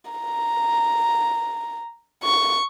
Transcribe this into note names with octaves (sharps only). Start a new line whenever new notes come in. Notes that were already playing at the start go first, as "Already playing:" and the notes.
A#5
C#6